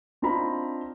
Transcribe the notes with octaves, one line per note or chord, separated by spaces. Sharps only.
C4 D4 D#4 F4 A#5 B5